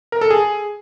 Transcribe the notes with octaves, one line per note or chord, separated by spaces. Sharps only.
A#4
A4
G#4